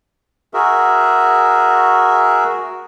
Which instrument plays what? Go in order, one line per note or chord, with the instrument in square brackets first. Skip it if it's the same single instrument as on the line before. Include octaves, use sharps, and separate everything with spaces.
[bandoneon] F#4 G#4 A#4 E5